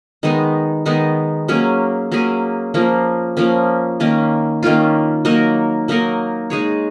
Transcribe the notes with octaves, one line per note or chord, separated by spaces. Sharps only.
D#3 G#3 B3 D#4
D#3 G#3 B3 D#4
F#3 A#3 C#4 G#4
F#3 A#3 C#4 G#4
F3 A#3 C#4
F3 A#3 C#4
D#3 A#3 C#4 F4
D#3 A#3 C#4 F4
F#3 A#3 D#4 A#4
F#3 A#3 D#4 A#4
G#3 D#4 G#4 C#5